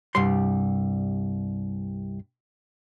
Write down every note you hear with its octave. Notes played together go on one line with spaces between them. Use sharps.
C2 G2 G3 C6